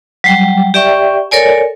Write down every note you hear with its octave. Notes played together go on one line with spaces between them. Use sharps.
F#3 G3 G5
G4 D5 E5 G5 C#6
A4 A#4 C#5 D5 G#5